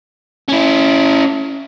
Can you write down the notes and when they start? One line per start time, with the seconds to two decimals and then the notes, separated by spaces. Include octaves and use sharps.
0.48 C#4 E4